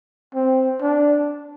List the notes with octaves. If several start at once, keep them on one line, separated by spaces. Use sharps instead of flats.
C4
D4